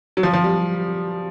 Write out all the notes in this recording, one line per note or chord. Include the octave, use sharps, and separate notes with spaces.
F#3
F3
F3
G3